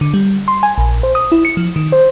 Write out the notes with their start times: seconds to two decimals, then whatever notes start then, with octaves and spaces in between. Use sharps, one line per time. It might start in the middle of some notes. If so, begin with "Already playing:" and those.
0.01 D3
0.14 G3
0.48 C6
0.63 G#5
0.78 A#1
1.03 C5
1.15 D#6
1.32 E4
1.45 C#7
1.57 F3
1.76 D#3
1.92 C5